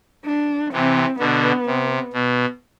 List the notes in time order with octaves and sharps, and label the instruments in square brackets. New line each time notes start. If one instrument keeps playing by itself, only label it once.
[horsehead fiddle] D4
[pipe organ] C3 E3 [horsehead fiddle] C4
[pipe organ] B2 D3 [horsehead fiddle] B3
[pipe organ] C3
B2